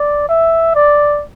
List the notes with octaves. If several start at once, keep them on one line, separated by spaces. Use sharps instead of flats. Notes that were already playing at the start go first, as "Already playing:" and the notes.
Already playing: D5
E5
D5